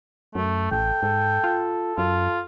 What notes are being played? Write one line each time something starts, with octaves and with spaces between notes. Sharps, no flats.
F#2 A3
A1 A4 G5
G#2 A4
F4
F#2 F4